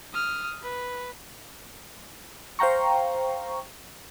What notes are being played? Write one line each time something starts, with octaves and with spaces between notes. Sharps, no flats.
D#6 F6
B4
C5 F5 G5 A#5 C#6